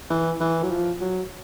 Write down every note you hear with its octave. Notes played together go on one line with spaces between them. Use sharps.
E3
E3
F#3
F3
F#3